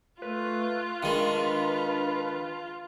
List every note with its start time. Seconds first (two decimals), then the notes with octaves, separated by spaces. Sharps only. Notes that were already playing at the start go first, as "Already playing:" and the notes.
0.22 A3 F4 B4
1.03 D#3 G#3 D4 B4